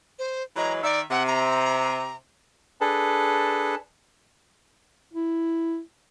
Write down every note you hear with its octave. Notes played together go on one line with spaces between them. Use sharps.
C5
E3 F#3 G#3 A#5
D#3 D5 E5
C3 F#5
A#5
D4 G#4 A4 B4 A5
E4